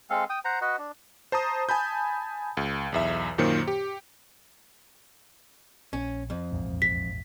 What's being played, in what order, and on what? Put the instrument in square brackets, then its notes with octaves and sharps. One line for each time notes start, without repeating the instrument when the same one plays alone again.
[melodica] G#3 C4 A4 F5
G5 D#6
C5 F#5 A#5
F#4 B4 D#5 F#5
D4
[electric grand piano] C5 A5 A#5 D#6
G#5 A5 B5 G6
C#2
B1 E2 E5
F#2 A#2 D#3 A#3 C5 C#7
G4
[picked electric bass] A#1 [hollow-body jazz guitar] C#4
[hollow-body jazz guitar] F2
[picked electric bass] A#1 E2 G#2
[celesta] B6